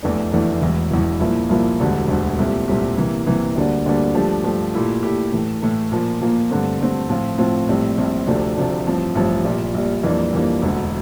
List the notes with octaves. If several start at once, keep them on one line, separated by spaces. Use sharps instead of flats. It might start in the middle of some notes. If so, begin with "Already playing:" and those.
F1 E2 E3 A3 D4
F1 E2 E3 A3 D4
E1 E2 E3
E1 E2 E3
C2 A#2 F3 A#3 E4
C2 A#2 F3 A#3 E4
E1 D2 D3 G3
E1 D2 D3 G3
C2 A#2 A3 C4 G4
C2 A#2 A3 C4 G4
C2 C3 E3 A#3
C2 C3 E3 A#3
D2 D3 G3 A#3 D4
D2 D3 G3 A#3 D4
G2 F3 A3 D4 G4
G2 F3 A3 D4 G4
A#2 A3 E4 G4
A#2 A3 E4 G4
A2 E3 A3
A2 E3 A3
A#2 F3 A#3
A#2 F3 A#3
G2 D3 A3 C4
G2 D3 A3 C4
A2 F3 C4 F4
A2 F3 C4 F4
A#1 A2 G3 C4
A#1 A2 G3 C4
D2 C3 F3 A3 D4
D2 C3 F3 A3 D4
A1 G2 F3 C4
A1 G2 F3 C4
A#1 A#2 G3
A#1 A#2 G3
F2 E3 G3 A#3 D4
F2 E3 G3 A#3 D4
E1 D2 D3